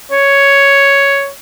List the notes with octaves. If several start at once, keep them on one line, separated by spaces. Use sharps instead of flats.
C#5